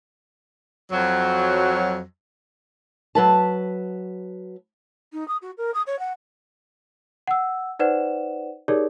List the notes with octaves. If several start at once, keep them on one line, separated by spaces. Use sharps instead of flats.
F2 F#3
F#3 B4 A5
D#4
D#6
F#4
A#4
D#6
C#5
F#5
F#5 E6
D#4 B4 C5 D5 F#5 E7
D#4 G4 G#4 A#4 C#5 D5